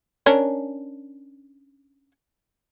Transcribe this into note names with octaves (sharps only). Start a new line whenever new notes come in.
C#4 D4 A#4